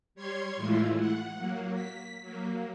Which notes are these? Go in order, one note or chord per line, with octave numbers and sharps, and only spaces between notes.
G3 C#5 C6 G#6
A2 E3 G#3 A3 E4 F4
F#5
F#3 A#3
B6
F#3 A#3